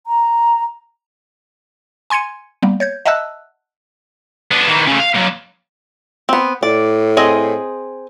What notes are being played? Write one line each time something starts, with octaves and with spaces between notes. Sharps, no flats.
A#5
G#5 C6 G#6 C#7 D#7
G3 A#3 B3
C#5 G6 G#6
D#5 E5 F#5 A5 E6 F#6
B3 D4
D#3 E3
C#3 A3
F5
F#3 A#3
B3 C4
A2 D5
C4 G#4 D#5